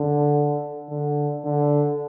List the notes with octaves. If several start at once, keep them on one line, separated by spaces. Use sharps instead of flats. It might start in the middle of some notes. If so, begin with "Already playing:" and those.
Already playing: D3
D3
D3